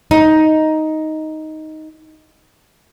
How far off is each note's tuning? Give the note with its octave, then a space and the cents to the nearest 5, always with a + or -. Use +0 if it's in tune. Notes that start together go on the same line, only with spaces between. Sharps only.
D#4 +5